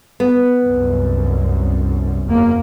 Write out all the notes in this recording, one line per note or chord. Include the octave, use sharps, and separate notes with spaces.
B3
C2 F#2
F#1 E2 A#3